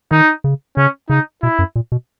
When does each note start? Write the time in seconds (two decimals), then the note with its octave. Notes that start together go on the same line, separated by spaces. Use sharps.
0.11 D#3 D#4
0.44 C#3
0.77 C#3 C#4
1.10 C#3 D#4
1.42 B2 E4
1.59 F#2
1.76 A#2
1.92 B2